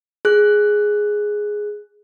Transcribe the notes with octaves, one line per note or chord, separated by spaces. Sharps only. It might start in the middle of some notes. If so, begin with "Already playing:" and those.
G#4 F#6